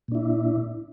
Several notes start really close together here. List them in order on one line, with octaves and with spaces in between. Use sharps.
A#2 D4 E4